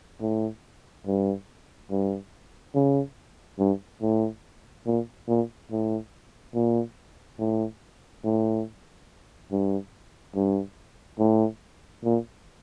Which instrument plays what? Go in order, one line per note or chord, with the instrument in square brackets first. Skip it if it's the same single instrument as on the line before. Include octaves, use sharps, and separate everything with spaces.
[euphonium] A2
G2
G2
C#3
G2
A2
A#2
A#2
A2
A#2
A2
A2
G2
G2
A2
A#2